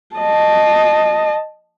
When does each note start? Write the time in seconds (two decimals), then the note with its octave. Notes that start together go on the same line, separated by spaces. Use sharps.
0.16 D#5 A5